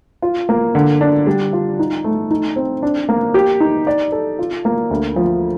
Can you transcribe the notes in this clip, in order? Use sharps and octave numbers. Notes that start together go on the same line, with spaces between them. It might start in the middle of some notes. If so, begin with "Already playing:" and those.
F4
A#3
D3
D4
G3
F4
D#4
A3
D#4
C4
D4
A#3
G4
D#4
D5
A4
F4
A#3
D2
F3